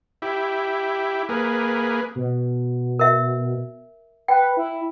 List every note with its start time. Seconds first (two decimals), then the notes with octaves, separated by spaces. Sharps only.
0.22 E4 G4
1.29 A#3 G#4 B4
2.15 B2
2.99 A#4 E5
4.28 B4 G5
4.57 E4